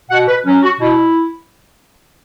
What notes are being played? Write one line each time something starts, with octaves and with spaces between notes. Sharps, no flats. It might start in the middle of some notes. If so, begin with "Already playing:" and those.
B2 F#5
B4
F#3 C#4
F#4
B2 E4